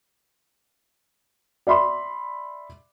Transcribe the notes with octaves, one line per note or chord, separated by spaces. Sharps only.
D5 E5 B5 C6